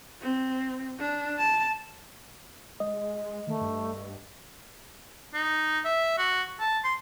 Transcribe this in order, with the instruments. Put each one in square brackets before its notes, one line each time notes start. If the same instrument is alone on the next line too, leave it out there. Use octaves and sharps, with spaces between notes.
[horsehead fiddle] C4
D4
A5
[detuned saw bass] G#3 [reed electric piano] D#5
[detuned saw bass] D#3 [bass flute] A3
[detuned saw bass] G2
[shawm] D#4
E5
F#4
A5
C6